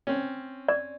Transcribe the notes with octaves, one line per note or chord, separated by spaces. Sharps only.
C4 C#4
D5